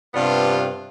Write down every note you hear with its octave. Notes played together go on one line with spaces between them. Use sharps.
G2 C3 B3 D4 F4